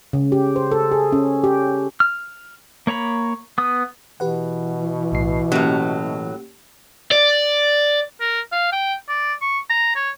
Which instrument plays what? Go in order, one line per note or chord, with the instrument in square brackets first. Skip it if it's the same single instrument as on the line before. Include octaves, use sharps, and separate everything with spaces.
[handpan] C#3
G4
C5
A4
G#4
C#4
G4
[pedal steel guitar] F6
A#3 C#5 A#5 B5
B3 D#6
[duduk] B2 [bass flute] E3 [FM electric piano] G4 B4 F#5
[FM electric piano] B1 A2 C7
[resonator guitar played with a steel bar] A2 F#3 [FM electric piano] A#3 C#4 G4
[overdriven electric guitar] D5
[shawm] A#4
F5
G5
D5
C#6
A#5
C#5